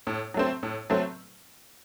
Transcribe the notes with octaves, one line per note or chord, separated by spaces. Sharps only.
A2
F#3 A3 C4
A2
F#3 A3 C4